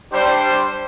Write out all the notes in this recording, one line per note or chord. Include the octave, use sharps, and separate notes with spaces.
G3 D4 G4 C5